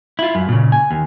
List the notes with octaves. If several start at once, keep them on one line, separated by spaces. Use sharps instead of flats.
E4 F4
F#2
A#2 C#3
G#5
D#2